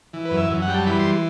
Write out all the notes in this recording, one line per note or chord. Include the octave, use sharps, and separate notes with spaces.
E3
B4
F#2
E5
F#2
F#5
G3 G5
A5
E3 B5
C6